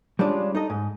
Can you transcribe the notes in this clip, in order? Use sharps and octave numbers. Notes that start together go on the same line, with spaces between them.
G3 G#3 C#4 D4 F4
D#4 A4 D#5
G#2